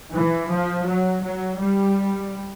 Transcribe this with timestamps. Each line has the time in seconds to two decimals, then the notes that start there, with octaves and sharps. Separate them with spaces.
0.13 E3
0.50 F3
0.86 F#3
1.22 F#3
1.58 G3